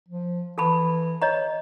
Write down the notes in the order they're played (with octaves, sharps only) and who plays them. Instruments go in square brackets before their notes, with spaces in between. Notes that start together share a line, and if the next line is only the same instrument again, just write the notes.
[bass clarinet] F3
[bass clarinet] E3 [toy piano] A4 A5 B5
[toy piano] C#5 D#5 A#5